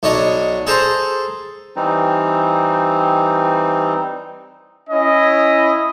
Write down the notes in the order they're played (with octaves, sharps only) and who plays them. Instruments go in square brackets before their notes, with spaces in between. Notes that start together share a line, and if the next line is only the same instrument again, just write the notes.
[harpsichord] B1 D4 C#5 D#5
G#4 A4 C5 A5 A#5
[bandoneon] E3 G3 C4 D#4
[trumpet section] C#4 E4 D#5